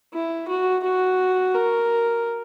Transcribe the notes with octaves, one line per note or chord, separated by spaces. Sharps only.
E4
F#4
F#4
A#4